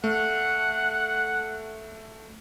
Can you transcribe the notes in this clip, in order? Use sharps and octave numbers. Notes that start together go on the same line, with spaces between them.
A3 F#5